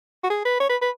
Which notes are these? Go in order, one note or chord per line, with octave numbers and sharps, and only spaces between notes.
F#4
G#4
B4
C#5
B4
B4